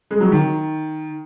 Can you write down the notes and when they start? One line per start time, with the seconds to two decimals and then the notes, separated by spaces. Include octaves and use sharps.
0.11 G#3
0.20 F#3
0.32 D#3